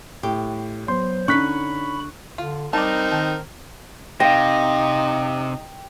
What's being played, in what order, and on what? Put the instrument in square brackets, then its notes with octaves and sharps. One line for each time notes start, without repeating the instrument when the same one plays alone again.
[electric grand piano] A2 [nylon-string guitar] G4
[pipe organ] F#3 C5 [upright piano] B3 [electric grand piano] C6
[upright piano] D3 [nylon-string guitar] C#4 D#4 [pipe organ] B5 [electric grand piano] C#6 F#6 B6
[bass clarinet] D3 [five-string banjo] F4
[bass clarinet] G3 [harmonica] C4 A#4 [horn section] D#4 [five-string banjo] D5 A5
[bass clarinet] D#3 [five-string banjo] A5
[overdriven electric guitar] C3 [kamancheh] D#4 [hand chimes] F5 A#6 [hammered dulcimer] G5